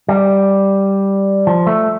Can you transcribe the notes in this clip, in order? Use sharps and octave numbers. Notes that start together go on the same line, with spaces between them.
G3
F3
A3